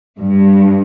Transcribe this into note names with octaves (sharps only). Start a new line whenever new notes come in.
G2